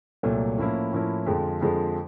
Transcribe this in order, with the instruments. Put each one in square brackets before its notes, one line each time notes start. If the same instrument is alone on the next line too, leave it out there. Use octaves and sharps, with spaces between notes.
[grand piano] C2 A#2 F#3 A3
A2 F3 A#3 C#4 E4
A2 F3 A#3 C#4 E4
F2 D3 F3 G#3
F2 D3 F3 G#3